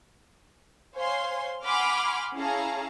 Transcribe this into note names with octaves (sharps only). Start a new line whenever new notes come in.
C5 C#5 F5 G#5 C6
F#5 G#5 B5 C6 D6 F6
C#4 E4 G#4 F5 A5 A#5